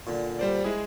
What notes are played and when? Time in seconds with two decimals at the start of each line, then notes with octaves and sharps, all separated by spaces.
0.07 A#2 D3
0.39 G3 C5 D5
0.64 G#3 E4 G#4